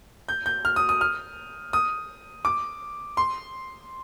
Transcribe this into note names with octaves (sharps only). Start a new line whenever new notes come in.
G6
G6
F6
D#6
D#6
F6
D#6
D6
C6